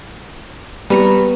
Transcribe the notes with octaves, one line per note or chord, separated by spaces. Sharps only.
G3 B3 A#5 C#6